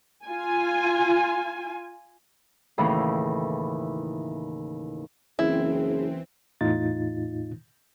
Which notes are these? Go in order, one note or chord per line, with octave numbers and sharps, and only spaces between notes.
F4 G#5
D#2 A2 C#3 E3
F#1 E3 C4 E4 G#4
E2 A2 D#4 F4 A6